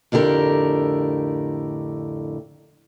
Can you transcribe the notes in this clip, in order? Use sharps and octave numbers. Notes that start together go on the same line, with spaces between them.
F2 A2 D3 G4 A#4